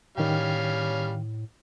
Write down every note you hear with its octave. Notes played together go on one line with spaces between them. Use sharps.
A2 D#3 G3 C#4 F5 G5